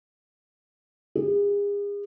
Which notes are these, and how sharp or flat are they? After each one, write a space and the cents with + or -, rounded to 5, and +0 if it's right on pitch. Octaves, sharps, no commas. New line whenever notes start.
G#4 -40